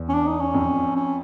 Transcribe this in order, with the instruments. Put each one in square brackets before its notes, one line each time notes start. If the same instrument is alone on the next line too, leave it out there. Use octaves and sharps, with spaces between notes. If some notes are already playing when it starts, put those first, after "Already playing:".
Already playing: [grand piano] E2
[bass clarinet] C#4
D4
D#4
C#4
[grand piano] F2
[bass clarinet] C#4